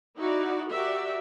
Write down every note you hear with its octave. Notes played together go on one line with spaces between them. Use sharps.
D#4 E4 F#4 D5
F#4 G4 A#4 D5 E5